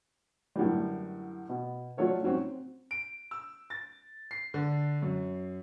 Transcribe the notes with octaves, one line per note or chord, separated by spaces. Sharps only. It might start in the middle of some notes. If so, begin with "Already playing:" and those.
F#2 A2 D3 E3 G3
B2
F3 F#3 A3 C#5 D5
G#2 F3 F#3 C4 C#4
C4
D7
E6
A6
C7
D3
F#2